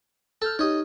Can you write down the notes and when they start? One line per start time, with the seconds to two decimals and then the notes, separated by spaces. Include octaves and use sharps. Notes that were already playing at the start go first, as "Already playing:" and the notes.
0.42 A4 F6 G6 A6
0.59 D#4 G4 C#5 D#5